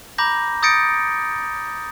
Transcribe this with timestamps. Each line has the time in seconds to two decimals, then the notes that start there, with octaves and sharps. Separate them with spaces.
0.18 A#5 B5 D6 G6 A#6
0.63 D#6 G6 A6 A#6 C#7 D7